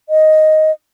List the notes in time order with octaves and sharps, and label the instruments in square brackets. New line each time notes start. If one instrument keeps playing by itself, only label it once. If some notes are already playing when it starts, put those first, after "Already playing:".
[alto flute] D#5